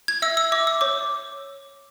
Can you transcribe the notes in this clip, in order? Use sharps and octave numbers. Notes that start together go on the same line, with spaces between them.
G#6
E5 E6
E6
E5 D6
E6
C#5 D6